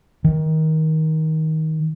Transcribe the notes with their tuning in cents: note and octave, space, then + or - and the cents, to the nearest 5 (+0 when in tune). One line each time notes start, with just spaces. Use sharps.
D#3 +20